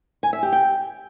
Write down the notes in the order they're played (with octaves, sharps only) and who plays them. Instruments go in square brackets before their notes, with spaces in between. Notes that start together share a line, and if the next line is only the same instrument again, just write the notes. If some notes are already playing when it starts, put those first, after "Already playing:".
[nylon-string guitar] G#5
E5
G4
G5